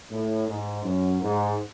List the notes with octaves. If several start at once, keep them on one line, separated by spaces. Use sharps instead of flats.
A2
G#2
F#2
G#2